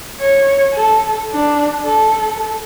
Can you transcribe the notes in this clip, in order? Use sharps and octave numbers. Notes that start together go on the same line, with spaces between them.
C#5
A4
D4
A4